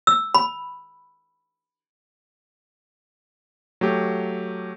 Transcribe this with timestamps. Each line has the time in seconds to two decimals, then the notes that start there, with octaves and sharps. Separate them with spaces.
0.07 E6
0.35 B5
3.81 F#3 A3 G4